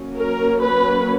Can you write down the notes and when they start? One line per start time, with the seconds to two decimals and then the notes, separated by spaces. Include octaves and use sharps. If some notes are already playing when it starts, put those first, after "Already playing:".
Already playing: F#3 A#3 C#4
0.17 A#4
0.64 B4